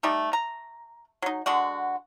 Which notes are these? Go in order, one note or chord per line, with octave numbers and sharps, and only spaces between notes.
G3 A3 D#4 G4
A#5
F#3 D#4
D3 G#3 F#4 F#5